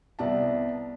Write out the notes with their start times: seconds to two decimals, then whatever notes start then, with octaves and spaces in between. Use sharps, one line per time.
0.19 C2 B3 D5 A5